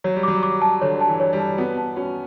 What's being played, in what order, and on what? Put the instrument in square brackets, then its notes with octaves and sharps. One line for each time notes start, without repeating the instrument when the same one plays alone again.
[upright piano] F#3 [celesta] C#5
[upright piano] G3
[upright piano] F#3 [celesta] D6
[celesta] D6
A5
[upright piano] D3 [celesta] C#5
[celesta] A5
[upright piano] E3
[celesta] C#5
[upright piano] G3
[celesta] A5
[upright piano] B3 [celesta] F#4
[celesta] A5
[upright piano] C#4 [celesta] F#4